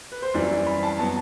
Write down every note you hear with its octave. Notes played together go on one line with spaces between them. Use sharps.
B4
C5
F#2 E3 G3 C4 D5
B5
A5
F#3 B3 A5